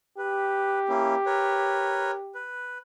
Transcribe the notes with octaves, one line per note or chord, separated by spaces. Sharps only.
G4 B4
A#3 C#4 E4
A#4 B4 C#5
B4